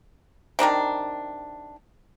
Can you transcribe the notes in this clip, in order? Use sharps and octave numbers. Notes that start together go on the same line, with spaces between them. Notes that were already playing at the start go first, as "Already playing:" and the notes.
C3 D#3 D4 A#4